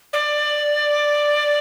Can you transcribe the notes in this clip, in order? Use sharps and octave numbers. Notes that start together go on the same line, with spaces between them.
D5